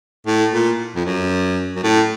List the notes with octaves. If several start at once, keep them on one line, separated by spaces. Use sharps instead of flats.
A2
A#2
F2
F#2
F#2
A2